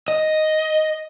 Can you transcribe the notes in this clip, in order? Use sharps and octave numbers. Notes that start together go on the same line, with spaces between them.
D#5